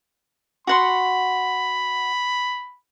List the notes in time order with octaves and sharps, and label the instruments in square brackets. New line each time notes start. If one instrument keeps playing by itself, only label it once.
[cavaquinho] F#4 F#5 C6 [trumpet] B5